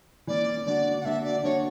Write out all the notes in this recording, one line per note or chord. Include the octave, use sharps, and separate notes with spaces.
E3 A#3 C#4 D5
D3 A#3 D4 F#4 D5
F#5
D3 A#3 D4 F#4 E5
D5
D3 A#3 D4 F#4 C#5